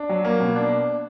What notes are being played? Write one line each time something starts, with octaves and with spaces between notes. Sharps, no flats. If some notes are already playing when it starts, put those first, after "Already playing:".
Already playing: D4
F#3
A#3
B2
D4